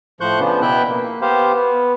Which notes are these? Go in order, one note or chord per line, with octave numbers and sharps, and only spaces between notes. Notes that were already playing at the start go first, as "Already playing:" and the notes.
A2 F3 C5 C#6 F#6 G6
C#3 F3 B3 D4
B2 B3 E4 E5 G5 F#6
A#3
B3 G4 C5 F5
B3